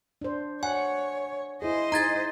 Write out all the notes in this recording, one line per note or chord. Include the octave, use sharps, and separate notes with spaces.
D4 C5
C#5 F#5 G#5
E4 G#4 C5 D#5
D#4 G#4 A#5 G#6 A6